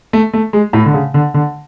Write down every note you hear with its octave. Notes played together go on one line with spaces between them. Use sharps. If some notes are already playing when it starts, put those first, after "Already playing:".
A3
A3
G#3
A2
D3
C#3
D3
D3